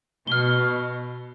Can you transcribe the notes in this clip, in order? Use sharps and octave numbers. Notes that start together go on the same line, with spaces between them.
B2 F6 G7